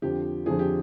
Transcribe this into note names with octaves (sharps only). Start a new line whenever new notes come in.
F2 D3 F3 G4
F2 D3 F3 G#4
G4